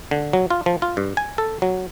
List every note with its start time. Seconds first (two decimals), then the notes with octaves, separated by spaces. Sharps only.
0.11 D3
0.33 F#3
0.50 F4
0.66 F3
0.82 F4
0.97 G2
1.17 G#5
1.38 A4
1.62 F#3